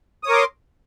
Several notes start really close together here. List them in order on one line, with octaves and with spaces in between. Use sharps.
D#6 C#5 A#4 D6 C6